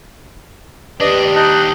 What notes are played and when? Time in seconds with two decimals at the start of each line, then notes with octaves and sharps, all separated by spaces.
1.00 D#2 D4 G4 B4 D5 D#5
1.36 D#4 D#5 A5 F#6